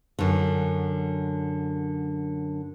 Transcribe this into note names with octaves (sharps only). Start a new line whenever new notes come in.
F#2 D3